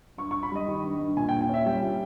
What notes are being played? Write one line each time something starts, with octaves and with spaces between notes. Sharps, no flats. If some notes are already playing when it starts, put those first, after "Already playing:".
G2 C#6
C#6
G2
B5
G3 D#5
D#3
G2
G2
A#2 G#5
G5
A#2
G5
C#4 E5
G3 G5
A#2